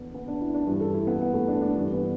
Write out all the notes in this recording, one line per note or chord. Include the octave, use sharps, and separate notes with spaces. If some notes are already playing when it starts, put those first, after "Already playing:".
Already playing: E2 D3 B3
B3
D4
E4
D4
G2 E3 E4
A4
E4
B3
B3
A3
D4
D4
G2 E3
B3